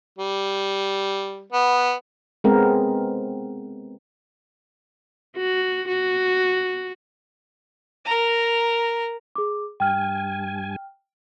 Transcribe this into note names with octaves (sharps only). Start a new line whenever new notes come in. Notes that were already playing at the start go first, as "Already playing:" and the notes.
G3
B3
G#3 B3 C4 A#4
F#4
F#4
A#4 A#5
G#4 D6
G2 G5 G#5 F6